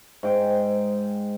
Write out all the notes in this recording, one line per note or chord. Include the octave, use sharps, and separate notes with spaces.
G#2 G5